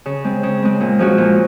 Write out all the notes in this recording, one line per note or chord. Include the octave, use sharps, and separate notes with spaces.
C#3
G#3 C4
C#3
G#3 C4
A#2
F3 G#3 C#4 F#4
A#2